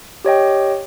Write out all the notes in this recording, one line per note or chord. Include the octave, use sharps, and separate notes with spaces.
G4 C#5 D#5 G5